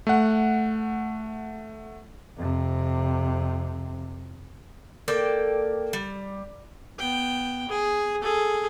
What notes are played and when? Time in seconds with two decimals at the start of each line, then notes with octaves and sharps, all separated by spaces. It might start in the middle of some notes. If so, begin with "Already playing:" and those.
0.07 A3 F#5
2.37 F2 C3
5.08 A#3 A4 D5 G5
5.93 G3
6.99 B3 G5
7.68 G#4
8.22 G#4 A4